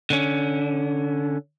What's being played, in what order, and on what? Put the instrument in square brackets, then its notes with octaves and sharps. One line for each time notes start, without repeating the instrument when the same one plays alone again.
[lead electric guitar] D3 C#4